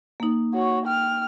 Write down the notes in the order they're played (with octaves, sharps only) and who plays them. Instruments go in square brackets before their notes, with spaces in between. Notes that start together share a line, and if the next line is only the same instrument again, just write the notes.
[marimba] A#3 D#4
[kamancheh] F#4 C#5
G5 F6